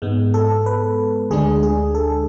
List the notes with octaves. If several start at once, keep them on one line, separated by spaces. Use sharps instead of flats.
G#2 G#3 B3
A4
B4
D2 D3 G#3 D4 G#4
G#4
A4